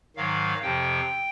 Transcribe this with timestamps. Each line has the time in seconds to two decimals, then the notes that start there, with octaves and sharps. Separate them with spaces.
0.16 G#2 D#3 F#3 F5
0.63 F2 C3 F3 G5